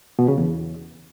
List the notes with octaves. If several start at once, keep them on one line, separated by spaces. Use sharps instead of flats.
B2
C#3
E2